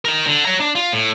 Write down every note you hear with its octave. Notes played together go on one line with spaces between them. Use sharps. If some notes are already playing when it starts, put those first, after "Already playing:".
D#4 A#4
D3
C#5 A#5
D4
F4
A2